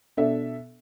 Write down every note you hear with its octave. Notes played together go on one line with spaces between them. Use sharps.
B2 D4 A4 E5